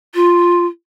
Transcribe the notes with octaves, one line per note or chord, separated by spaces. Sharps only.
F4